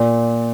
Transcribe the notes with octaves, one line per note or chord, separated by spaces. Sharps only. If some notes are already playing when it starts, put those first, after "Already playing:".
Already playing: A#2